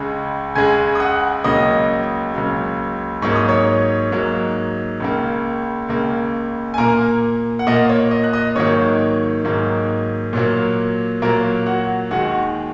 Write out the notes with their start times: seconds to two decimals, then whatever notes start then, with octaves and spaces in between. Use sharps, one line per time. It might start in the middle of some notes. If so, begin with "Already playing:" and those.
Already playing: C#2 C#3 G#3
0.55 C#2 C#3 G#3 G#5 G#6
0.95 D#6
1.00 F#5 F#6
1.44 C#2 C#3 F#3 A#3 D#5 D#6
2.34 C#2 C#3 F#3 A#3
3.22 G#2 F#3 A#3 C#6
3.35 D#6
3.48 C#5 C#6
4.11 G#2 F#3 A#3
5.00 C#2 C#3 A#3
5.89 C#2 C#3 A#3
6.74 G#5
6.78 A#2 A#3 A#4 A#5
7.59 F#5
7.67 A#2 A#3 D#5
7.89 C#5
8.11 D#5
8.24 F#6
8.33 D#5 D#6
8.55 G#2 D#3 F#3 A#3 C#5 C#6
9.44 G#2 D#3 F#3 A#3
10.33 A#2 F#3 A#3
11.22 A#2 F#3 A#3 A#4 A#5
11.66 F#4 F#5
12.11 D#2 D#3 G#3 F#4 F#5